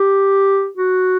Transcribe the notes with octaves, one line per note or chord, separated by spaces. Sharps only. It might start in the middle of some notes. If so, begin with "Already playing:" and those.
Already playing: G4
F#4